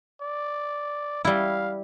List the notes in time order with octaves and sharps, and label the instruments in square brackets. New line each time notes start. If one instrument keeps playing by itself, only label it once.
[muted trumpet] D5
[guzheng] G3 E4 [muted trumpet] F5